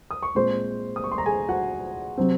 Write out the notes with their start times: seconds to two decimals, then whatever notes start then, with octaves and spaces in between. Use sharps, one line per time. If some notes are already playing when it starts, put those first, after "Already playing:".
0.11 D#6
0.23 C#6
0.35 A#2 G#3 C4 C5 C6
0.96 D#6
1.04 C#6
1.11 C6
1.18 A#5
1.26 G#4 G#5
1.49 F#4 F#5
2.18 C3 F#3 C4